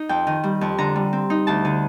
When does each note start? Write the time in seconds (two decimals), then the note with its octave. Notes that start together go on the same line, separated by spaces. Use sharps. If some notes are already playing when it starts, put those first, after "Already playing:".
Already playing: D#4
0.09 F2 G5
0.27 D#3
0.43 G3
0.61 F2
0.78 D3 A#5
0.96 G3
1.13 C4
1.30 D#4
1.47 D2 A5
1.65 D3